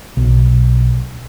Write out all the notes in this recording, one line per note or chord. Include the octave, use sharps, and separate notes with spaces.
B1